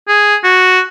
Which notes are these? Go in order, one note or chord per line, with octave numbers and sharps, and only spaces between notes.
G#4
F#4